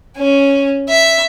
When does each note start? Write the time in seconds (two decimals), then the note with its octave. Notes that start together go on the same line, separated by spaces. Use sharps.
0.17 C#4
0.90 E5